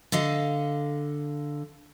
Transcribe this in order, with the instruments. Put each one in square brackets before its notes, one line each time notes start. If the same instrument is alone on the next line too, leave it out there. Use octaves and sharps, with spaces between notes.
[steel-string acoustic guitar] D3 A4 D#5 F5